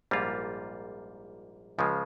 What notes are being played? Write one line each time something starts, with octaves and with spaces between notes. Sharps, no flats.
A#1 G#2 G3 A#3 F4
C#2 C#3 F3 G#3